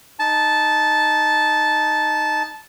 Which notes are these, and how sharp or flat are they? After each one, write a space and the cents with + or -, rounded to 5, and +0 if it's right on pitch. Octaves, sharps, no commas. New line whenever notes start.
D#4 +0 A5 -10